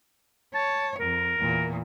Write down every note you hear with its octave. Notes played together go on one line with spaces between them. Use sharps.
C#5 A5
F2 A#4
E2 A#2